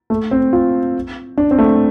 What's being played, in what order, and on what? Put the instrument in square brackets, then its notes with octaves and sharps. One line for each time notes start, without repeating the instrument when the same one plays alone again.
[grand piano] A3
C4
F4
D4
C4
A3